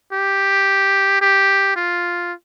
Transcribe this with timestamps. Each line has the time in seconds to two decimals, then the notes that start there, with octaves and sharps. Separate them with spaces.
0.13 G4
1.21 G4
1.76 F4